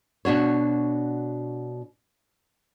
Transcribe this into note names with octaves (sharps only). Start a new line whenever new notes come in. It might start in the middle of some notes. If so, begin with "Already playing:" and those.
B2 D4 F#4 C#5